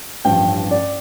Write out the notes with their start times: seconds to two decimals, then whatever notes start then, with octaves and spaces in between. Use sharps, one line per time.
0.25 A1 G2 F3 G5
0.71 D5